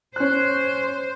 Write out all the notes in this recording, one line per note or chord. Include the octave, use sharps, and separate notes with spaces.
C#4 C5 F#6